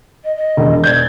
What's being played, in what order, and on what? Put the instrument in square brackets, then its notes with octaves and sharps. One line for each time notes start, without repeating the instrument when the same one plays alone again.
[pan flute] D#5
D#5
[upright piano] E1
[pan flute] D5 [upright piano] G6 G#6